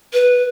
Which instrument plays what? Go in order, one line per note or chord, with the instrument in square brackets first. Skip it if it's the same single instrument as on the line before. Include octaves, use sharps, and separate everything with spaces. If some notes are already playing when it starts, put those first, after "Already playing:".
[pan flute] B4